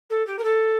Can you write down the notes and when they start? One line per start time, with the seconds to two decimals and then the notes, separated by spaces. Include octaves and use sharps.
0.10 A4
0.26 G4
0.38 A#4
0.43 A4